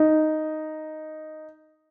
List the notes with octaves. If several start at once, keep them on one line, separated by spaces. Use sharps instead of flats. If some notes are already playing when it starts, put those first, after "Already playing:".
Already playing: D#4